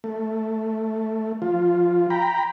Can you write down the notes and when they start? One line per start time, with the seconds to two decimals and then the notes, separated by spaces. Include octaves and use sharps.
0.04 A3
1.42 F3 F4
2.10 G5 A#5 B5